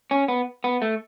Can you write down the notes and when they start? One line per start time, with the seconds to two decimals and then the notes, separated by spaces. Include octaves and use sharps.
0.11 C#4
0.28 B3
0.64 B3
0.82 A3